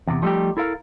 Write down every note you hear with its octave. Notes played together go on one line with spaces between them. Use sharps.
E2 C3
F3 G3 A3 B3 D#4 G4
E4 A4 A#4 F5